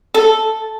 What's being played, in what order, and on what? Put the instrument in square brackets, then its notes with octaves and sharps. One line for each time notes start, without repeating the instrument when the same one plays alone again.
[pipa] A4